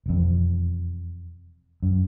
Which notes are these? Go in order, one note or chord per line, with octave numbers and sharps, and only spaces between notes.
E1 F2
F#2